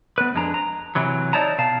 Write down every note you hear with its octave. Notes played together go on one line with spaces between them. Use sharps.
B3 B4
F2 G#3 D4 A#5
A#5
C3 E3 F#3
D#4 E4 C#5 D5 A5 A#5
B2 F5 A5